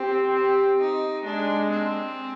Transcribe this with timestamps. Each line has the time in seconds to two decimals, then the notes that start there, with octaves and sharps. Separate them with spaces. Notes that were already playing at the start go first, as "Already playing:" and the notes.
Already playing: C4 G4
0.34 G4
0.80 D#4
1.25 G#3 D4
1.71 C4